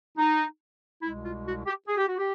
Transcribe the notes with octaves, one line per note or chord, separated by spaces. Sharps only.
D#4
C2 B2 G#3 E4
F4
F#4
G4
G#4
G4
F#4
G4